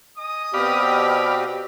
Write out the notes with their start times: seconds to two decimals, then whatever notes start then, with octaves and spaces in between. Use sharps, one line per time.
0.18 D#5 G#5 D#6
0.54 B2 C4 G4 D5 F5 B5